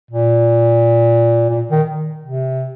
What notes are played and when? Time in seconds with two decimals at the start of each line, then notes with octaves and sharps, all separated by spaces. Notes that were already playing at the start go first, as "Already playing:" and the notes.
0.11 A#2
1.49 A#2
1.71 D#3
2.24 C3